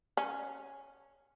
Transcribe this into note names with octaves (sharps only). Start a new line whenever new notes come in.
C#4